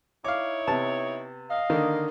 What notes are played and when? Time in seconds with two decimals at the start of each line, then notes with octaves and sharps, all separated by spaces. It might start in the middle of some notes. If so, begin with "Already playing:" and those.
0.24 D#4 E4 C#5 F5 D6
0.68 C3 B3 A5
1.50 D#5 F5
1.70 D3 D#3 A#3